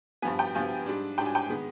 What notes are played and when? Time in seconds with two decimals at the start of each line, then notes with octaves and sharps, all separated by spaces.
0.22 G2 F3 B3 G#5
0.39 G5
0.55 G2 F3 B3 G#5
0.86 G#2 G3 D4
1.18 G#2 G3 D4 G5
1.26 G#5
1.35 G5
1.49 D#3 G#3 B3